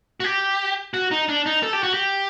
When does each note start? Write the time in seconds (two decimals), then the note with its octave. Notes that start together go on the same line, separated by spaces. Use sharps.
0.20 F#4
0.24 G4
0.94 F#4
1.11 D#4
1.29 D4
1.46 D#4
1.63 A4
1.73 G4
1.83 F#4
1.94 G4